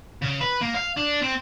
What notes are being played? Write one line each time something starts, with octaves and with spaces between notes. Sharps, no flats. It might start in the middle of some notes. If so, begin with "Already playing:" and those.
C#3
B4
A#3
F5
D4
C4